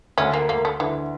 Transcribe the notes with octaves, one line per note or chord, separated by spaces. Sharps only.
D2 C#4
A#3
D2 A#3
A3
D3 E3